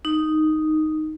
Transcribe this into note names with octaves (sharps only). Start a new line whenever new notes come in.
D#4